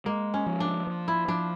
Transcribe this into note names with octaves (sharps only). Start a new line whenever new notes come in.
G#3 A#3
C#4
F3
D4
F3
E4
F3 D4